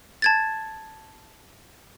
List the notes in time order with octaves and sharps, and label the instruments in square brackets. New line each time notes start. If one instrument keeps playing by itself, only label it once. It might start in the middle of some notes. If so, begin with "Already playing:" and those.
[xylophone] A5 G#6 A6